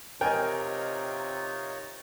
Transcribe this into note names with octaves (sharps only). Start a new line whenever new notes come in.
C3 D#4 F4 A#4 C#5 D#5 G5 G#5